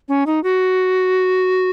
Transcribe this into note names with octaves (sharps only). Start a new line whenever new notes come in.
C#4
D#4
F#4